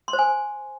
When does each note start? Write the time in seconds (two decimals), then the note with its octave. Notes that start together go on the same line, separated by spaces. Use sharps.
0.08 C6
0.13 C5
0.19 G#5